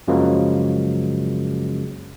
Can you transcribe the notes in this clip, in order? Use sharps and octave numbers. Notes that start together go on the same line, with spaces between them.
F#2 C#3 F3 F#3 G#3 A#3